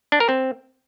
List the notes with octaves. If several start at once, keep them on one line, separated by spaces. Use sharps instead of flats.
D4
A#4
C4